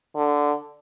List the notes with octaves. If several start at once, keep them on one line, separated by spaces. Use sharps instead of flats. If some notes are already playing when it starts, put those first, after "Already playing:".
D3